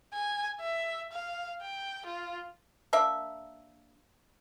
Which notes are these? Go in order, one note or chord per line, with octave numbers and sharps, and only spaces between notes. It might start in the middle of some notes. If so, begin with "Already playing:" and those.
G#5
E5
F5
G5
F4
A#3 D4 E5